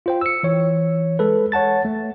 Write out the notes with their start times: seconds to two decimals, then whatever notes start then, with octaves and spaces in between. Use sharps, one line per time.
0.06 F4 C5 G5
0.21 E6 C#7
0.43 E3 C#5
1.19 G#3 A4 B4
1.52 C#5 F#5 A5 A6
1.85 A3